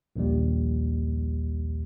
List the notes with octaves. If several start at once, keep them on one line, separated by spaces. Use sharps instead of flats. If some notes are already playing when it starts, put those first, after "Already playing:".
A#1 D#2 G3